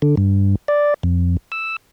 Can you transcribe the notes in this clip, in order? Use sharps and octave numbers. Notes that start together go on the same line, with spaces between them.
D3
G2
D5
F2
E6